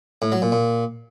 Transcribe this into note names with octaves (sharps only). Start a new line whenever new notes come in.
A2
F#3
A#2
A#2